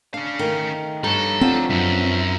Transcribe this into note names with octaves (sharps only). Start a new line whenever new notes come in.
C#4 D4 F5
D#3 A3
G2 D#4 A4 C#5
F3 B3 C4 D4
F#2 D#4 E5